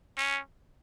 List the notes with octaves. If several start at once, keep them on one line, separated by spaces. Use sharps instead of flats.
C#4